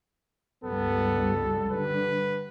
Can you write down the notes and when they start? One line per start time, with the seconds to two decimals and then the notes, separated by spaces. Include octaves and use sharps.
0.64 G1 C#2 G3 B3 A4
1.72 D3 G3 B4